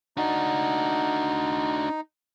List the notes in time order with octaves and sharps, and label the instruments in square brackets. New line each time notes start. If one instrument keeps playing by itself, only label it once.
[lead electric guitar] D4 F#4 [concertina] D#4